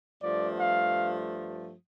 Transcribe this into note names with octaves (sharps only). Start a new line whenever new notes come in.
G2 F3 A3 D5
F5